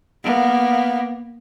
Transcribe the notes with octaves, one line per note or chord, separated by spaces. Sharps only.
A#3 B3